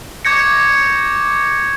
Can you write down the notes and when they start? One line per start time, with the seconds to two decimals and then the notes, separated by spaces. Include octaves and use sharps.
0.25 C#6 D6 G6 G#6 A#6 C#7